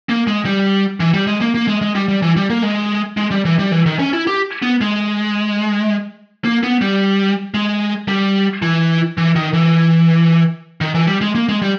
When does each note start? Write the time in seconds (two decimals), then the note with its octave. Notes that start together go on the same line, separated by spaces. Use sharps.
0.09 A#3
0.27 G#3
0.45 G3
1.00 E3
1.14 G3
1.27 G#3
1.41 A#3
1.55 A#3
1.68 G#3
1.82 G#3
1.95 G3
2.08 G3
2.22 E3
2.36 G3
2.50 A#3
2.63 G#3
3.17 G#3
3.31 G3
3.45 E3
3.59 G3
3.72 E3
3.86 D#3
3.99 C#4
4.13 E4
4.27 G4
4.62 B3
4.81 G#3
6.45 A#3
6.63 B3
6.82 G3
7.54 G#3
8.08 G3
8.62 E3
9.18 E3
9.36 D#3
9.53 E3
10.81 D#3
10.95 E3
11.07 G3
11.21 G#3
11.35 A#3
11.49 G#3
11.62 G3